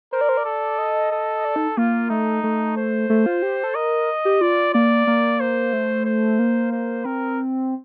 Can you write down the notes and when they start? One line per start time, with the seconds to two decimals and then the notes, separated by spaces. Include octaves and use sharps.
0.12 A#4 C5
0.21 D5
0.29 C5
0.37 D5
0.45 A4
0.78 D#5
1.12 A4
1.45 D5
1.56 D#4
1.77 A#3 F4
2.10 A3 D#4
2.44 A3
2.77 C5
3.09 A3
3.26 F4
3.42 G4
3.64 A4
3.75 A#4 D#5
4.25 G4
4.41 F4 D5
4.74 A#3 D5
5.07 A#3
5.40 C5
5.73 A3
6.06 C5
6.39 A#3
6.72 C5
7.05 C4 A#4